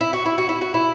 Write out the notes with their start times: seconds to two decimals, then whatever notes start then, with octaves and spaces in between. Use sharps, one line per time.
0.01 E4
0.13 F#4
0.26 E4
0.38 F#4
0.49 E4
0.61 F#4
0.74 E4